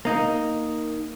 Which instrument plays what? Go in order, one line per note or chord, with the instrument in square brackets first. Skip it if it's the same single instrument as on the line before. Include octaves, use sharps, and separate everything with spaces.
[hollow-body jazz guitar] A#3 D#4